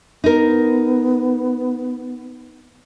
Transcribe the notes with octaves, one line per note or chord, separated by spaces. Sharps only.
B3 D#4 A#4